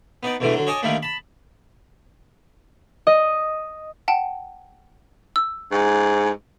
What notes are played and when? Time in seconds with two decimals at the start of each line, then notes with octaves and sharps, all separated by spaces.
0.23 B3 D#4 D5
0.40 E2 B2 D3 E3 A3
0.53 D3 F#3
0.67 C#5 D#5 G#5 A5 D6 D#6
0.83 D3 D#3 G3 A3 A#3
1.03 A5 B5
3.07 D#5
4.08 F#5 G5 A5
5.36 E6
5.72 G#2